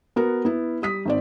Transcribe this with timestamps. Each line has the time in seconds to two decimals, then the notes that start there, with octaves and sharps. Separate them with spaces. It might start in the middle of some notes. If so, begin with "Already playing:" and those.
0.16 B3 F#4 A#4
0.45 B3 E4
0.82 G3 D#6 B6
1.05 G#1 C4 D5